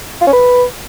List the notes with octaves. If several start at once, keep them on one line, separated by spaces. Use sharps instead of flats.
F4
C#4
B4